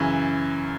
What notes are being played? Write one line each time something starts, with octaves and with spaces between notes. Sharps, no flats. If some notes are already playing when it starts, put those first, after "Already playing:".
Already playing: F#2 C#3 E3